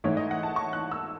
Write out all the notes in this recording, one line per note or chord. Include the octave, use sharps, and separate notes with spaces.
G#2 E3 A3 D#4 C#5
D#5
F#5
A5
C#6
F#6
E6